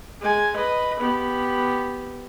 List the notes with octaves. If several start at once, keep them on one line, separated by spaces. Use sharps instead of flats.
G#3 G#5
B4 D#5
B3 G4